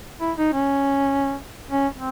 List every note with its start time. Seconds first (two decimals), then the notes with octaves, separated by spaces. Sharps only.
0.21 E4
0.38 D#4
0.54 C#4
1.70 C#4
1.95 C4